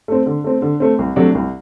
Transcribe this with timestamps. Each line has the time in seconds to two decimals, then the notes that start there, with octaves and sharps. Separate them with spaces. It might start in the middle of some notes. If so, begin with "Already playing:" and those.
0.08 A3 C4
0.26 D3
0.44 A3 C4
0.62 D3
0.80 A3 C4
0.99 C2
1.16 C3 F#3 A3 D4
1.35 C2